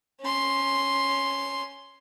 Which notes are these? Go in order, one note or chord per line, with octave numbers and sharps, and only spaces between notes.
C#4 C6